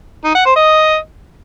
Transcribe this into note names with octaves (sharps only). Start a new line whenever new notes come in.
D#4
F#5
C5
D#5